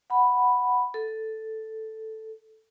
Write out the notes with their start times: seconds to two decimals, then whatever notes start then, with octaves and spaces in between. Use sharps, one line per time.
0.10 F#5 B5
0.94 A4